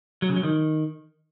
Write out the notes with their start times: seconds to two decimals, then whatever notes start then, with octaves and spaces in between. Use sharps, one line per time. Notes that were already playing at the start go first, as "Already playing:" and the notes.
0.22 F#3
0.29 C#3
0.36 F#3
0.43 D#3